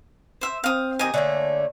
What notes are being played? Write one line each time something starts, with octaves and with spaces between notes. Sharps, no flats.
C5 E5
C4 F5 D#6
D#3 A#3 G4 G#5 D#6
D3 A3 A#3 C#5